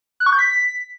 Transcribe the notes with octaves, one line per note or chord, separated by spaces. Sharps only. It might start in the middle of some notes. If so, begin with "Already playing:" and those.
F#6
C#6
G6
B6